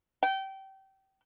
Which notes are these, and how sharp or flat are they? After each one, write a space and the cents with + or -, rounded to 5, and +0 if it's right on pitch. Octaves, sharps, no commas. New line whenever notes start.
G5 -25